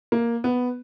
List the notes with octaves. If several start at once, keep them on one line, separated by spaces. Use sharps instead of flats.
A#3
B3